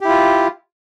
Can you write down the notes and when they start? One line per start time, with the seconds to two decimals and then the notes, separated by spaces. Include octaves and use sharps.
0.01 G4
0.05 E4
0.09 F4